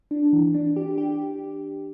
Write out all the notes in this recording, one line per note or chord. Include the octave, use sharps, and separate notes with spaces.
D4
E3
D4
G4
G4